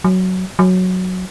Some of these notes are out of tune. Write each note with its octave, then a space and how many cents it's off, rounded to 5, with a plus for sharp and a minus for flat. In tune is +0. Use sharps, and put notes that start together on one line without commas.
F#3 +5
F#3 -5